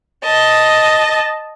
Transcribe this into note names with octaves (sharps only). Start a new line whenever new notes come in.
D#5 A5